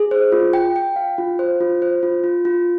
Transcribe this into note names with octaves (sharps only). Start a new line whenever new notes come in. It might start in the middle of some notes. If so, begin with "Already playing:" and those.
Already playing: G#4
C5
F4
G5
G5
F5
F4
C5
F4
C5
F4
F4
F4